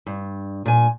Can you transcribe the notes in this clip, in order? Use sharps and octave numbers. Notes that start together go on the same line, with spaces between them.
G2
A#2 G#5